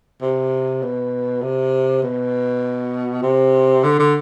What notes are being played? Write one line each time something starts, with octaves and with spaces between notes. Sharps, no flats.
C3
B2
C3
B2
C3
D3
D3